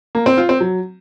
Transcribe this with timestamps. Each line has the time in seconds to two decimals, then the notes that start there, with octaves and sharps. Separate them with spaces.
0.15 A#3
0.26 C4
0.38 F4
0.49 C4
0.60 F#3